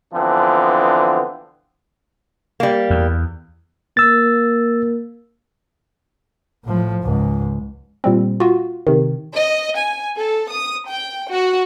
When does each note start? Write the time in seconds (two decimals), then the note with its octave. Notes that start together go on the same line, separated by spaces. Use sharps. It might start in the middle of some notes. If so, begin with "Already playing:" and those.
0.14 D3 E3 F3 B3 C4 D4
2.60 G3 A#3
2.90 E2
3.97 A#3 E6 A6
6.65 A2 F3
7.03 C#2 G#2
8.04 A#2 G3 C4
8.40 F4 F#4
8.87 C3 D#3
9.34 D#5
9.77 G#5
10.17 A4
10.50 D#6
10.88 G5
11.30 F#4